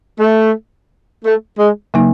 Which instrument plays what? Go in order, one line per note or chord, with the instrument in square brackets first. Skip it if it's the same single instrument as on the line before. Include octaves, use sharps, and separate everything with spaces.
[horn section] A3
A3
G#3
[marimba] C#3 F#3 A#3 D#4